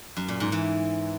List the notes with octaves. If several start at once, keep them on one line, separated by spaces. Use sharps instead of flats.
F#2
A#2
G#2
E3